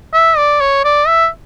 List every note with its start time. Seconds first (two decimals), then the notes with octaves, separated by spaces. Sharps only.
0.14 E5
0.37 D5
0.61 C#5
0.85 D5
1.07 E5